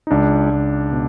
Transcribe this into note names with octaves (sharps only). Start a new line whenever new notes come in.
D#4
C#2 D4
C#2
B2